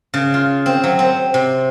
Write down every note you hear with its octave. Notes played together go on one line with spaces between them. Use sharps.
C#3
F4
C4
F#3
C4
C3